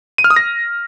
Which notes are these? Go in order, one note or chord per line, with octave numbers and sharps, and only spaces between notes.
D#7
F6
D#6
A#6